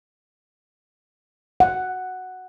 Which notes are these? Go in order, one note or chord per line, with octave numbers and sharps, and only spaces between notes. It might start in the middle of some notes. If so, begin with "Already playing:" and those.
F#5